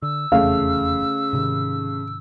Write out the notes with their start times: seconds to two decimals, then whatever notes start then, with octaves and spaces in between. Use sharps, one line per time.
0.02 D3 E6
0.32 F1 E2 C#3 A3 F5
1.33 G#2 C3 D#3